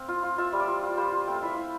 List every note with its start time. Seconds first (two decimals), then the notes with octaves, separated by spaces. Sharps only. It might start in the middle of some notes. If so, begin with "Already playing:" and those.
Already playing: C4 F5
0.08 F4
0.23 F4
0.38 F4 E5
0.53 G3
0.60 D5
0.68 F4
0.83 F4
0.97 G3 C5
1.12 F4
1.27 A3 G5
1.36 F5
1.42 E4 E5
1.54 E4 F5